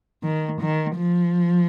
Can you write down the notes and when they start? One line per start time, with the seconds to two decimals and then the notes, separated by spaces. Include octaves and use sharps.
0.23 D#3
0.61 D#3
0.97 F3